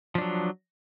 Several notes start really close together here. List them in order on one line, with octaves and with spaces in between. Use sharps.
F3 D4 F#3